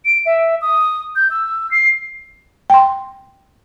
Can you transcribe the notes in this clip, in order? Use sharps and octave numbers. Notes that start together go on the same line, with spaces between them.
D7
E5
D#6
G6
E6
C7
G5 C6